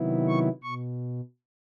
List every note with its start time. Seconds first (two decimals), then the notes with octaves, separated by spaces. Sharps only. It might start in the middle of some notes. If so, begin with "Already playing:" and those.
Already playing: C3 D#3 F#3 B3 E4
0.28 C#6
0.63 B2 C#6